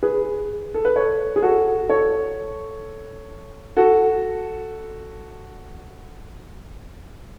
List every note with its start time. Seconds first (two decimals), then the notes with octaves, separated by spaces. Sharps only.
0.03 G#4 B4
0.74 A4
0.85 B4
0.96 A4 C#5
1.36 G#4
1.42 F#4 A4
1.89 A4 C#5
3.77 F#4 A4